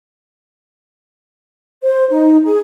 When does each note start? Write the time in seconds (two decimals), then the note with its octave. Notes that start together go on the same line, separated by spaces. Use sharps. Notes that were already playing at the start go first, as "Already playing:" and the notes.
1.83 C5
2.10 D#4
2.45 G#4